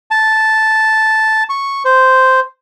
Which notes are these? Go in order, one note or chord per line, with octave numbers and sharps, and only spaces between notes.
A5
C#6
C5